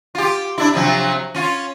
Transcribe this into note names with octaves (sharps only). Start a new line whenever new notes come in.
F4 G4
D4 E4
C3 F3 F#3
C#4 F4